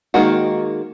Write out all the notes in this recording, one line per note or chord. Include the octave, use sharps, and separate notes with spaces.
D#3 G#3 A#3 F#4